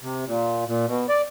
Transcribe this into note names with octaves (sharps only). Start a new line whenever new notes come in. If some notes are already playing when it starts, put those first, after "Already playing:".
C3
A#2
A#2
B2
D5